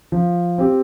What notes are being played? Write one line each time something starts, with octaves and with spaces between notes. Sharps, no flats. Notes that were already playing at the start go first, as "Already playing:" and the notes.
F3
C4 G4